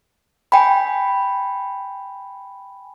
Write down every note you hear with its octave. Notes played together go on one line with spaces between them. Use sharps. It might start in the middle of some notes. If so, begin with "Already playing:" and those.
G5 G#5 B5